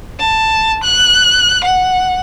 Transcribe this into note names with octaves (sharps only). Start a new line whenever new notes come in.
A5
F#6
F#5